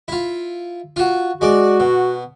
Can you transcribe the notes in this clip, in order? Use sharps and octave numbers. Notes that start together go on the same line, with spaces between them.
E4 F4
F4 F#4
G#3 F#4 D5 D6
B2